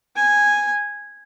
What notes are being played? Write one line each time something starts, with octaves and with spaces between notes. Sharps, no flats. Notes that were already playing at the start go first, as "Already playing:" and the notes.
G#5